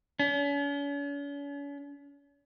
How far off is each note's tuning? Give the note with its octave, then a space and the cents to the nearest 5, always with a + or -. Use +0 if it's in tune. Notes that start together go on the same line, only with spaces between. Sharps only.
C#4 +45